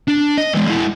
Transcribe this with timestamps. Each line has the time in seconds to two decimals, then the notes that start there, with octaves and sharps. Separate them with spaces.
0.08 D4
0.37 D#5
0.54 E3 G#3
0.67 G#3 E4